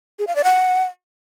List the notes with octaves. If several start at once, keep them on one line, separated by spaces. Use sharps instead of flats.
G#4
F5
D5
F#5